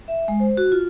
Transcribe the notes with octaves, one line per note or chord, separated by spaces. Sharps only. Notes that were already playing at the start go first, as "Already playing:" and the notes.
E5
G#3
C5
F#4
F4